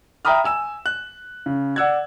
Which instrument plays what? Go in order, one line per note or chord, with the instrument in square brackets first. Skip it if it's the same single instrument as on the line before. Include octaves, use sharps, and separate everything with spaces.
[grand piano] E5 G5 A#5 B5 D#6 F6
G#5 E6 E7
F#6
C#3
D5 F#5 E6 F#6 G#6